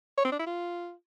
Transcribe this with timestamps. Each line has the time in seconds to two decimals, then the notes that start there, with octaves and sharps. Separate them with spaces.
0.18 C#5
0.25 C4
0.32 D4
0.39 E4
0.47 F4